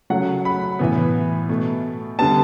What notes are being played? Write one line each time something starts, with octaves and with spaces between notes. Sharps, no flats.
C#3 F#3 A3 F#5
B5
A2 E3 B3
B2 A3
D3 G3 B3 A5